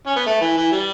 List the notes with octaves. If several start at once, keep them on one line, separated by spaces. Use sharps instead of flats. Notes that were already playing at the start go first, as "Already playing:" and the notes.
C#4
B3
A3
E3
E3
G3